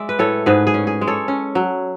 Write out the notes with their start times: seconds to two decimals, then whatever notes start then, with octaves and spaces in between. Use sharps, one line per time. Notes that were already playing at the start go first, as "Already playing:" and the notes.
Already playing: G#3 D5 E5
0.09 B4
0.19 A2 A4 C#5
0.46 G#2 G#4 B4
0.67 G#4
0.74 C#4
0.87 G#4
1.01 G#3
1.07 A4 C#5
1.28 C#4
1.55 F#3